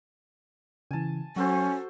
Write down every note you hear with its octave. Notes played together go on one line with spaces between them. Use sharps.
C#3 E3 G#5 A5
F#3 C#4 F#4 A4 C5